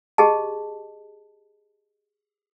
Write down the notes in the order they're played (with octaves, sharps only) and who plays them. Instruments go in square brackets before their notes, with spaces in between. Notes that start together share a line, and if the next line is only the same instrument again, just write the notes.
[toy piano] G4 G#4 D#5 A5